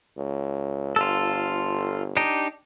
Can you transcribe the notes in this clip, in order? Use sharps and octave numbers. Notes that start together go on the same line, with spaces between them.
C#2
G1 F4 A4
D4 D#4 G4